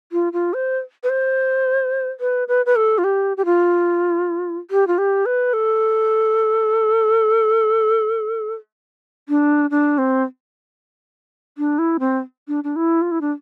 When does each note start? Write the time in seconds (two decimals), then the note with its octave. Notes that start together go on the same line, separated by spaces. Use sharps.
0.12 F4
0.33 F4
0.54 C5
1.03 B4
1.09 C5
2.20 B4
2.48 B4
2.66 B4
2.76 A4
2.98 F4
3.04 G4
3.37 G4
3.45 F4
4.71 G4
4.87 F4
4.98 G4
5.26 B4
5.53 A4
9.29 D4
9.70 D4
9.98 C4
11.58 D4
11.78 E4
12.00 C4
12.48 D4
12.64 D4
12.76 E4
13.02 F4
13.11 E4
13.21 D4